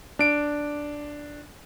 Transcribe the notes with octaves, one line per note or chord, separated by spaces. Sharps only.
D4 D7